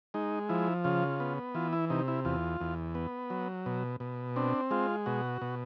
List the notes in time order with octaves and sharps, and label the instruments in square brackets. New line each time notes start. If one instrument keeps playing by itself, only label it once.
[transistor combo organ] G#3 D#4
F3 E4
C#3 F4
B3
E3 F4
E4
C3 D#4
E4
E2 F4
E2
B3
F#3
B2
B2
C4 D4
G#3 F4
B2 F#4
B2